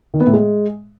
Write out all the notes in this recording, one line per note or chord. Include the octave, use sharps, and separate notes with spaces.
D#3
B3
A2
G#3